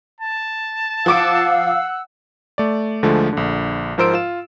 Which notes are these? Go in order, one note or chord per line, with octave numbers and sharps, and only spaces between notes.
A5
F3 F5 F#5 D6 E6 D7
A3 D5
D2 D3 F3 G#3 A3
A#1 D3
G#2 F3 A#4 C5 E6 D7
F4 E7